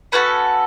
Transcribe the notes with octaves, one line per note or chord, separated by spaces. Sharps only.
C#4 F#4 A4 B4